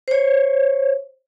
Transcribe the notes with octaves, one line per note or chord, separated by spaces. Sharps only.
C5 C#5